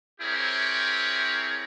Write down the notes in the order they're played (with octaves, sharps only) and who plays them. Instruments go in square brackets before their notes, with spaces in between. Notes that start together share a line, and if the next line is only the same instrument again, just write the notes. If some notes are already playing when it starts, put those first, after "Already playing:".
[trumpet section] C4 E4 G4 G#4 A#4 C#5